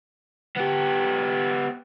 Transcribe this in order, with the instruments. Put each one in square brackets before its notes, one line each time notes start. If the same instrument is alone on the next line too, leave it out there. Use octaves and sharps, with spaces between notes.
[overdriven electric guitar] B3 G4